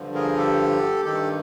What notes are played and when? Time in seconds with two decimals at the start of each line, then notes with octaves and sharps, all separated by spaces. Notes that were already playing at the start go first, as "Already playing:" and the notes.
Already playing: G2 D3 F3
0.14 G#4 A#4
0.37 G4 A4
1.05 G2 D#3 G4 A4